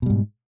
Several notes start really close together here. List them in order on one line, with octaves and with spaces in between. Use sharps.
B2 G3 G#2